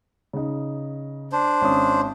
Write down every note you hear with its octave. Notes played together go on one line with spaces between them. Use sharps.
C#3 D#4
D4 C5
G#1 C#4 D#6